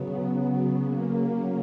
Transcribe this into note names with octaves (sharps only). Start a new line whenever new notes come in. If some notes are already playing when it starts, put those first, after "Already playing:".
Already playing: C#3 F#3 B3
C#3 F#3 A#3